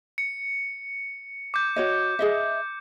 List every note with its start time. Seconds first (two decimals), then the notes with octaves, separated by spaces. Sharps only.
0.18 C#7
1.54 D6 G6
1.76 F#4 C#5 D#5
2.19 G#4 D#5 E5